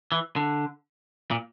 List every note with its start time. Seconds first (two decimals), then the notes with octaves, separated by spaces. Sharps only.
0.12 E3
0.36 D3
1.31 A#2